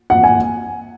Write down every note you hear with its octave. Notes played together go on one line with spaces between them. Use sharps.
F#5
G#5